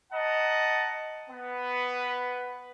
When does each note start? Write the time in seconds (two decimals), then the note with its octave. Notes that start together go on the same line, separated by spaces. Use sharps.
0.12 D#5 F#5 A5 A#5
1.30 B3 B4